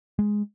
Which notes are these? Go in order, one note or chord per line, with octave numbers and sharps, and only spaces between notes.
G#3